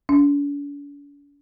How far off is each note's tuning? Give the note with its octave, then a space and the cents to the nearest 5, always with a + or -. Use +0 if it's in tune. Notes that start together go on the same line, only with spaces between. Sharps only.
D4 -45